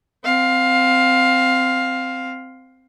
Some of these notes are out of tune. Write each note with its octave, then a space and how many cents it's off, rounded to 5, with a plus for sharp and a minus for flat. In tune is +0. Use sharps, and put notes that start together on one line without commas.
C4 -10 F5 +15